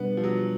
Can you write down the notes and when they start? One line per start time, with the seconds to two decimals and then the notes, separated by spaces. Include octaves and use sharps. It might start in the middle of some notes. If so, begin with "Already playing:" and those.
Already playing: B2 G3 B3 D4
0.17 F3
0.24 F#3